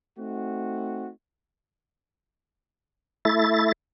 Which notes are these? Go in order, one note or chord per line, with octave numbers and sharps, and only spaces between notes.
A3 C4 D#4 F#4
A3 E4 A6